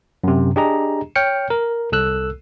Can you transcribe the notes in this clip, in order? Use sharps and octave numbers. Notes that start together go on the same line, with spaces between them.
F#2 C3
D4 G4 G#4 D#5 A#5
C#5 G5 F6 C#7
A#4
C2 A4 E6 F#6